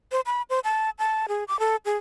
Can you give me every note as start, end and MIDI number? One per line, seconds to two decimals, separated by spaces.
0.12 0.21 72
0.26 0.42 83
0.50 0.60 72
0.64 0.90 81
0.99 1.26 81
1.28 1.44 68
1.48 1.59 86
1.60 1.76 69
1.85 1.97 68